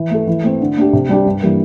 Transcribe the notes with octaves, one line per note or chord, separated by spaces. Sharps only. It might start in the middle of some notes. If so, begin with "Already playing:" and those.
Already playing: E3
A3 E4 A4
E3
A3 C4
D3
A3 D4 G4
C3
G3 D4 G4
G2
E3 G3 A#3